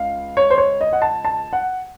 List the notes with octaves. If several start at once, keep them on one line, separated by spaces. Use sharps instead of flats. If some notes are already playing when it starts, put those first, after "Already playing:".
Already playing: C#2 F5
C#5
C5
C#5
D#5
F#5
A5
A5
F#5